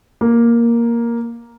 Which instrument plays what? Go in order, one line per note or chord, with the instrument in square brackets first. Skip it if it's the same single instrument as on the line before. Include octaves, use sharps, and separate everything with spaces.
[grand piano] A#3